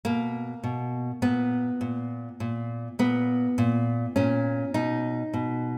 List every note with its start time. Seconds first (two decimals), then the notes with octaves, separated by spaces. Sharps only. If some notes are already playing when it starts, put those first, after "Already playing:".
0.05 B2 A#3
0.64 B2
1.22 A#2 B3
1.81 A#2
2.40 A#2
2.99 A#2 B3
3.58 A#2
4.16 A#2 C#4
4.74 B2 D#4
5.34 B2